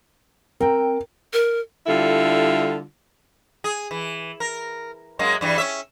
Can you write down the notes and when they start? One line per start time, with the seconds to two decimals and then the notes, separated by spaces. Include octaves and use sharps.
0.60 C4 A#4 G5
1.33 A#4
1.86 D3 G3 E4 F4 A4
3.64 G#4
3.91 E3
4.40 A#4
5.19 F#2 G#3 A#3
5.41 G2 E3 G3
5.58 C#4 E5